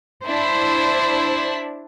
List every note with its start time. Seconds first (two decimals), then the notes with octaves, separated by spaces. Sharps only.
0.26 D4 E4 C5